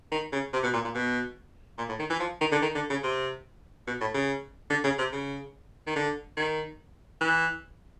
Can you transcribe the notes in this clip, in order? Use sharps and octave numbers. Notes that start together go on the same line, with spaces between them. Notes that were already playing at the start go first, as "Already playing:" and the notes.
D#3
C#3
C3
B2
A#2
A#2
B2
A#2
A2
D#3
E3
F3
D#3
D3
D#3
D3
C#3
C3
B2
A2
C#3
D3
C#3
C3
C#3
D#3
D3
D#3
E3